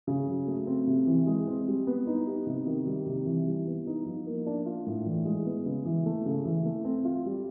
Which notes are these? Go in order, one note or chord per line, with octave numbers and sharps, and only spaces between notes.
C#3
F#3
A3
C4
C3
E3
G#3
C4
G3
B3
D#4
G4
C3
D#3
G3
C3
E3
G3
B3
D#4
F3
A#3
D4
F4
A2
E3
G#3
B3
C#3
E3
A3
C#3
E3
A3
C4
F4
G3